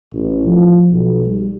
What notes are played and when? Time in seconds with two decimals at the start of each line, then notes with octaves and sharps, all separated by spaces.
0.13 A1
0.45 F3
0.89 B1
1.26 G3